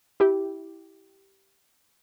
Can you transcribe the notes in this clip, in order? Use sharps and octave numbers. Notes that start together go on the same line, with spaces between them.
E4 G4